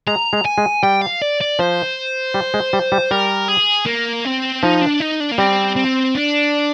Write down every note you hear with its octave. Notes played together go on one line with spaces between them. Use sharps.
G#3 A#5
G#3
G#5
G#3
G3 G5
F5
D5
D5
F3 C5
G3
G#3
G3
G3
G3 A#4
G#4
A#3
C4
F3 D#4
D4
D#4
D4
A#3
G3 C4
C4
D4